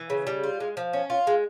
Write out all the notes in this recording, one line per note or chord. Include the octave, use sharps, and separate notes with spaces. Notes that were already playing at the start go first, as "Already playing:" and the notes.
Already playing: E3
C#3
G3
F4
G#3
F3
C#4
F4
G#3